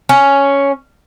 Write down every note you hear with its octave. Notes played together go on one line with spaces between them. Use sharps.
C#4